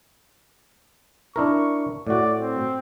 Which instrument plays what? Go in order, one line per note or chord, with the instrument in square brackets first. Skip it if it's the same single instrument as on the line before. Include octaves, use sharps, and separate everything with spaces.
[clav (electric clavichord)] D4 E4 A#4 [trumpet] C#6
[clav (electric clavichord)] A2 F#4 [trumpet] D5
[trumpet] C4